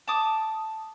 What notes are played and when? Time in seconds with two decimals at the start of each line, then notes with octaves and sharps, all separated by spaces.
0.08 A5 D6 D#6